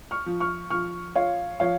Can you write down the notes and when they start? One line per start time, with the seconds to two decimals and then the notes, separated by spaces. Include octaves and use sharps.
0.11 C#6 F6
0.26 F3
0.40 C#6 F6
0.70 F3 C#6 F6
1.15 F4 C#5 F5
1.60 F3 C#5 F5